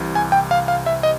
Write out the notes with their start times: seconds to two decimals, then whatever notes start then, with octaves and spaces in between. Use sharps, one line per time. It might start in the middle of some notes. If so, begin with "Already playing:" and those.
Already playing: C2 C3 E3
0.15 G#5
0.32 G5
0.51 F5
0.68 F5
0.86 E5
1.03 D#5